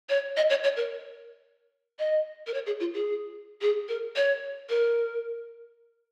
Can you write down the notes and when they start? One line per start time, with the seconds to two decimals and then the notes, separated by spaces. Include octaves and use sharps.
0.09 C#5
0.37 D#5
0.50 C#5
0.64 C#5
0.76 A#4
1.99 D#5
2.47 A#4
2.54 C#5
2.66 G#4
2.80 F4
2.94 G#4
3.62 G#4
3.88 A#4
4.16 C#5
4.69 A#4